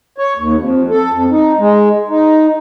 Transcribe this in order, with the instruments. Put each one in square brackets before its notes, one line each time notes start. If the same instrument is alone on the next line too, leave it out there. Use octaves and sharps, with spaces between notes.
[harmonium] C#5
D#2
F2
A4
F2
D#4
G#3
D#4